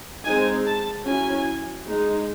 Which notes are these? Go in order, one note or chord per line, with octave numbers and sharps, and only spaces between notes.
G#3 C4 D#4 G#5
A5
F#3 C#4 E4 G#5
G#3 D#4